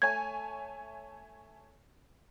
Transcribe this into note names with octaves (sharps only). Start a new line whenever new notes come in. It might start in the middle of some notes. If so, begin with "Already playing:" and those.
A3 C#5 G#5 G#6